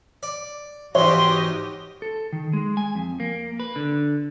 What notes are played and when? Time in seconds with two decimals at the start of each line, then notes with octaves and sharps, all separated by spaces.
0.23 D5
0.95 E2 G#2 F#4 G4 C#5 D#5 C6
2.02 A4
2.33 D#3
2.53 G#3
2.77 G#5
2.95 F2
3.20 A#3
3.60 B4
3.76 D3